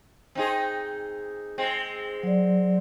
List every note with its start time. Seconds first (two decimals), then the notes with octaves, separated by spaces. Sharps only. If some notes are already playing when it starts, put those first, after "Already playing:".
0.35 C4 D#4 G#4
1.58 G#3 C4
2.23 F#3 D5